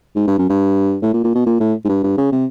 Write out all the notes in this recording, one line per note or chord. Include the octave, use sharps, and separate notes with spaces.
G#2
G2
F#2
G2
A2
A#2
A#2
B2
A#2
A2
G#2
G2
G2
C#3
C3